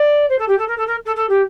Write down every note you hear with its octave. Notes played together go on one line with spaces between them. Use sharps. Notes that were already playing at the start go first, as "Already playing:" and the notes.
Already playing: D5
C5
A4
G4
A4
A#4
A4
A#4
A4
A4
G4